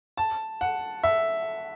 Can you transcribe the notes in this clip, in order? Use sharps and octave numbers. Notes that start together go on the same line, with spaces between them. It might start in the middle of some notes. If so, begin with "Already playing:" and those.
A5
F#5
E5